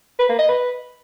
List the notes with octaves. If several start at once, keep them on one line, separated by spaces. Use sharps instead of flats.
B4
A#3
D#5
B4